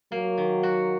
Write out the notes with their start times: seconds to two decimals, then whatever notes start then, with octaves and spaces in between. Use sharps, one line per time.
0.12 F#3 A#3
0.38 D#3
0.63 F#4